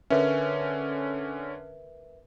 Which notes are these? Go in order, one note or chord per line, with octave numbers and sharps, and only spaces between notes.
D3 C#4 A#4 B4 E5